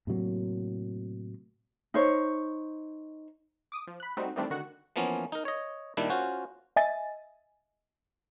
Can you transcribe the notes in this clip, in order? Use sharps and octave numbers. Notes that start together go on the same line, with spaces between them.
A2 C3 F#3 A#3
D#4 C5 C#5
D6 D#6
F3
B5 F#6
G3 A3 C4 D#4 F#4
D#3 E3 G3 A3 C4 D4
D3 D#3 F#4 F#5
E3 F3 A#3 B3 C#4
D#4 A#4
C#5 D#5
A#2 D#3 G3 D4 E4
C#4 F4 F#4 C5
D#5 E5 G#5 A6